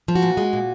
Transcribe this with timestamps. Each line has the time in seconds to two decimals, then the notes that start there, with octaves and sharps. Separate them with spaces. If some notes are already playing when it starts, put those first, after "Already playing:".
0.08 F3
0.15 F#4
0.22 A#2
0.37 G#3
0.53 A#2